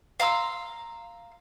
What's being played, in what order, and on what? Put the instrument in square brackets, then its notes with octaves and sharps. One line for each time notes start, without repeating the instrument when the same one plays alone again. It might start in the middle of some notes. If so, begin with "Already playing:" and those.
[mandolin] F5 A#5 C6 E6